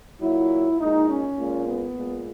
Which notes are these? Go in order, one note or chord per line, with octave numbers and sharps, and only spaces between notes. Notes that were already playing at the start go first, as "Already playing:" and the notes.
A#2 F#3 E4
A#2 G#3 D#4
C#4
A#2 G#3
B3
A#2 G#3